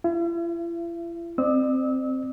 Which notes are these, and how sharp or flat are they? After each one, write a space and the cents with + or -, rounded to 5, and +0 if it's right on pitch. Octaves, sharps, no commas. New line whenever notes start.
E4 +45 E5 +45
C4 +0 D5 +40 E6 -35